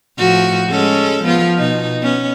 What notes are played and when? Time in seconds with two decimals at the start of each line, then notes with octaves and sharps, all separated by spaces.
0.18 A2 F3 F#4
0.69 G#3 C#4 A4
1.23 F3 B3 F4
1.57 B2 D#4
2.02 B3 C#4